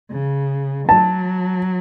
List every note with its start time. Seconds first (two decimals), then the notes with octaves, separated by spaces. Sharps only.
0.11 C#3
0.89 F#3 A5